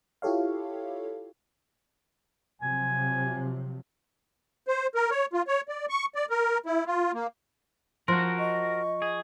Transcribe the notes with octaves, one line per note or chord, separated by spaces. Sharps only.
E4 F4 G4 A4 C#5 F5
C3 F3 F#3 G#5
C5
A#4
C#5
F4
C#5
D5
C#6
D5
A#4
E4
F4
A#3
F3 F#4 A#4 C5 C6
D#5 C#6
G#4